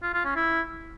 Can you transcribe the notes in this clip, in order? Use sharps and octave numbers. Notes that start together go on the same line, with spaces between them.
F4
F4
C#4
E4